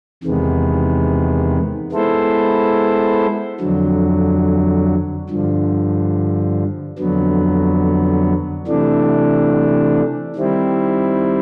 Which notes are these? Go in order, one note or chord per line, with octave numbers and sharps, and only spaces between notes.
E2 C3 D#3 G#3 B3
G#3 B3 E4 A4 C5
F2 D3 F#3
G2 D3 F3
F2 D3 F#3 B3
C3 E3 A3 D4
D#3 G3 C4 E4